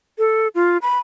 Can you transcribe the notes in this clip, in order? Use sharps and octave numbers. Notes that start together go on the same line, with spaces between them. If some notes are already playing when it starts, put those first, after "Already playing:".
A4
F4
B5